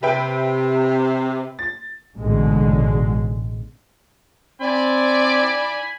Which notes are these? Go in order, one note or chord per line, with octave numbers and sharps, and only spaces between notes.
C3 B4 E5 G5
A6
A1 G#2 B2 D3 G#3
C4 D5 G#5 B5